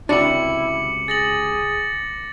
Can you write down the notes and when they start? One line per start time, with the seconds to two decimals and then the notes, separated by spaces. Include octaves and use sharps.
0.09 C#2 C3 D4 E4 F#4 D6 C#7 F#7
1.08 G#4 A6 A#6 F#7